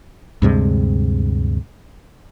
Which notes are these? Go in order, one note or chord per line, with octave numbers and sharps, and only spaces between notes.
D2 G2 C3 G#3